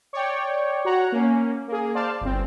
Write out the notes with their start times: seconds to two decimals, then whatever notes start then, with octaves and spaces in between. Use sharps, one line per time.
0.13 C#5 D5 G5
0.85 F#4 C#5 F#5 A#5 F#6
1.12 A#3 C#4
1.68 A#3 G#4
1.94 C5 D5 F5 A5
2.21 G1 C4